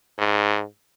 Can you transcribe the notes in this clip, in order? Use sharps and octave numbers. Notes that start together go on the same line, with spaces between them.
G#2